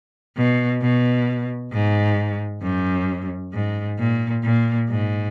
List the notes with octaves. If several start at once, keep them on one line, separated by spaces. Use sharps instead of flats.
B2
B2
G#2
F#2
G#2
A#2
A#2
G#2